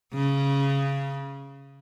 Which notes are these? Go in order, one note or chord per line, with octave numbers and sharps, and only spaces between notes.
C#3